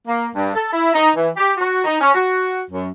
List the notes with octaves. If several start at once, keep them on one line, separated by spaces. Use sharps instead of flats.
A#3
G2
A4
E4
D#4
E3
G4
F#4
D#4
C#4
F#4
F#2